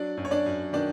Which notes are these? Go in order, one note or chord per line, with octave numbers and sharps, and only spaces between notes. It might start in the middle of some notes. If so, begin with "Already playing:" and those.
Already playing: F#3 D4 D5
F#2
C#5
D4 D5
F#2
D#3 D4 D5